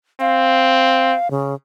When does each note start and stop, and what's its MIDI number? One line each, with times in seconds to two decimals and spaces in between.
0.20 1.15 60
0.20 1.31 77
1.31 1.54 49